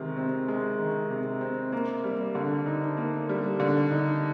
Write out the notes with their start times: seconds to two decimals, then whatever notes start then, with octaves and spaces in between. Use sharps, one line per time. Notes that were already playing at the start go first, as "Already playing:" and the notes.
Already playing: C3 D#3 G#3
0.17 C4
0.48 G#3
0.79 D#3
1.10 C3
1.41 C4
1.72 A#3
2.04 G3
2.35 D3
2.66 D#4
2.97 A#3
3.29 G3
3.60 D3
3.91 D#4